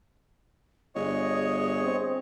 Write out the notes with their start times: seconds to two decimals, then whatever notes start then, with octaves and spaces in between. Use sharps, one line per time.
0.95 G1 G#4 C#5 D#5 C#6
1.83 C4